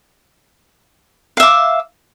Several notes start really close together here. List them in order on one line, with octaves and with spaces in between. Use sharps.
F5 E5 D6